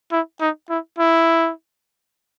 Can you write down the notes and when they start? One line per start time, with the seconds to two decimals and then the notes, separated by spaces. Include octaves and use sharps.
0.12 E4
0.41 D#4
0.70 E4
0.99 E4